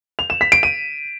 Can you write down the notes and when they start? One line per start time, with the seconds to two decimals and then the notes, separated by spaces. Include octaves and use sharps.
0.19 F7
0.30 E7
0.41 B6
0.52 D7
0.63 D#7